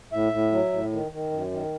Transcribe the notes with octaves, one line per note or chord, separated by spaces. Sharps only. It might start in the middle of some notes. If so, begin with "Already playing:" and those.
A2 E5
A2
F#3
A2
D#3
D#3
F#2
D#3